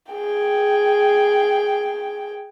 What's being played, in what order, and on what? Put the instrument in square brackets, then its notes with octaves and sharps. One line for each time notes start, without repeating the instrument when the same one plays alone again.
[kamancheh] G#4 G5